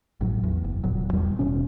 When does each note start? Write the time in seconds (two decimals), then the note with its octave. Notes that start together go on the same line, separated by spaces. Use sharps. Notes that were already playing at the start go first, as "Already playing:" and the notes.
0.21 A1 A2 F#3
0.43 E2
0.64 F#1
0.84 D#1 A#2 F#3
1.13 E2 G3
1.39 D#1 B2 C#4